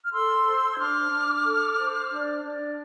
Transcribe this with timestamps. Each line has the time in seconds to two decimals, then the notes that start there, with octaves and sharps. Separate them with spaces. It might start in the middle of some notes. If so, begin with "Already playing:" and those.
0.04 F6
0.12 A4 C6 E6
0.45 C5
0.74 G#6
0.78 D4 D6 F6
1.12 D4
1.45 A4
1.78 C5
2.11 D4
2.44 D4